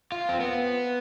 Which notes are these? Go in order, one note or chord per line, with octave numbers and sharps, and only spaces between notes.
F4
C4
B3